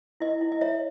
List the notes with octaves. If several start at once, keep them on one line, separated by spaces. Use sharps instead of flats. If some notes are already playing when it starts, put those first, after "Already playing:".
E4 D#5
E4
D#5
C#5 E5